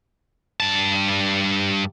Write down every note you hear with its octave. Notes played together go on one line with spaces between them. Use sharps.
G2 A5